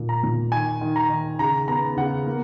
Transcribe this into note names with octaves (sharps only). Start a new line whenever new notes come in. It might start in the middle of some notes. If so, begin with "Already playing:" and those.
Already playing: A#2 A#3
A#5
A#2
D#3 G#5
D#3
A#5
D#3
C#3 A#5
B3 A#5
C#3 F#5
A#3